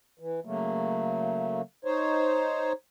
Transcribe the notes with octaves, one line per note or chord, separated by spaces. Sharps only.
E3
C#3 F#3 A3 A#3
D#4 C5 C#5